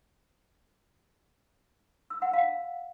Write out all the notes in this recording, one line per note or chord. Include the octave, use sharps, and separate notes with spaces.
E6
F#5
F5